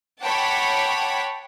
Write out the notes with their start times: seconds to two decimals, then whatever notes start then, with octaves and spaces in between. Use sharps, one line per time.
0.24 C#5 F#5 G5 A5 B5 D6